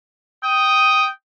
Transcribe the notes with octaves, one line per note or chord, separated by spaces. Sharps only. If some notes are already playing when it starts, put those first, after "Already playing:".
G5 D#6